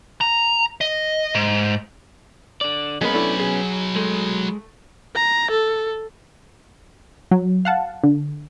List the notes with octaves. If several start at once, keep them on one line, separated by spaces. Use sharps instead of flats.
A#5
D#5
G#2
D3 D5
F#3 G#3 A#3 B3 C#4 B5
A3 D4 E4
G#4
G#3 A3
A#5
A4
F#3
F5 F#5 A5
D3